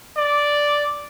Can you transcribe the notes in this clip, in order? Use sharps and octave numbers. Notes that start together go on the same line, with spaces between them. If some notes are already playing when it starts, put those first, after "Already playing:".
D5